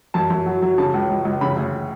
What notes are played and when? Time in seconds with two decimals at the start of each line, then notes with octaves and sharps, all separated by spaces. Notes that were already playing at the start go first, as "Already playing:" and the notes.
0.14 F#2 A5
0.30 F#2
0.46 F#3
0.62 F#3
0.78 C#3 A5
0.94 C#2
1.10 C#2
1.25 C#2
1.41 C#3 B5
1.56 D2